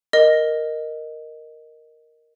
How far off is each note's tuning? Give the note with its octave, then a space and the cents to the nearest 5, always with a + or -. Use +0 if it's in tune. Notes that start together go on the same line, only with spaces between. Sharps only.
A#4 +0 D#5 -5